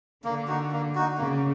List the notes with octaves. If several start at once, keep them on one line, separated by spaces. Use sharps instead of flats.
D3 A#3
D#4 F#4
A#3
D#4 F#4
C#3 A#3